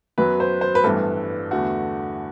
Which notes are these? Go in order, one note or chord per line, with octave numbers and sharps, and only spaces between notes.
F#2 F#3 B3 B4
C5
C5
B4
A1 G2 E3 B3 A4
E2 D3 A3 F#4